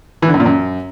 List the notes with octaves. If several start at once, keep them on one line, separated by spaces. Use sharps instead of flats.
E3
D3
F#2
A#2
F#2